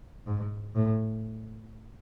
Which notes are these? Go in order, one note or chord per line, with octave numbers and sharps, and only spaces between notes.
G#2
A2